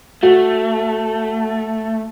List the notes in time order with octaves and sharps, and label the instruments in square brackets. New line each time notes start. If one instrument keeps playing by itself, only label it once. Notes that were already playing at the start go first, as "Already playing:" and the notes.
[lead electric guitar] A3 [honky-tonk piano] F#4